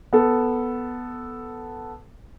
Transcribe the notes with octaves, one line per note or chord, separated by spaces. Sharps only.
B3 A4